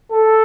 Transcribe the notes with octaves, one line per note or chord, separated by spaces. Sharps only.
A4